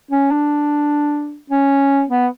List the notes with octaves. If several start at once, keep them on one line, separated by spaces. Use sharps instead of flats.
C#4
D4
C#4
B3